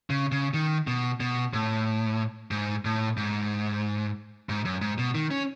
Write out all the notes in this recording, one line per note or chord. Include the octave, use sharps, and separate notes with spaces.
C#3
C#3
D#3
B2
B2
A2
G#2
A2
G#2
G#2
F#2
G#2
B2
D#3
C#4